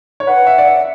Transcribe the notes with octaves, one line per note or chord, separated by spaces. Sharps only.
C#5
B4 F#5
E5
D5
E5